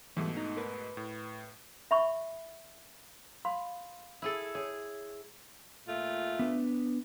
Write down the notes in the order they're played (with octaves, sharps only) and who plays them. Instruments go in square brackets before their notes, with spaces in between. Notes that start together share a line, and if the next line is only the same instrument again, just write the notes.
[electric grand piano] G#2 B2 A3 [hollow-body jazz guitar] E3 G3
[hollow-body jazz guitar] D#4
A#4 B4
[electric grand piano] A2
[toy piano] E5 B5 C#6
F5 B5 C6
[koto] E4 G#4 A4
[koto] G#4 [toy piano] C#5
[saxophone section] A#2 A3 F4
[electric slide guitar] B3 D4 B4